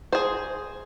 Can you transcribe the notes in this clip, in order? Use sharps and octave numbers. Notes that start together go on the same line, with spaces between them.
G#4 C5